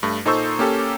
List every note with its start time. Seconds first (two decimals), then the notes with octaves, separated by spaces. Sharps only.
0.03 G2 A3
0.25 A#2 D#4 A4 C5 C#6 E6
0.59 A#3 C#4 G4 A4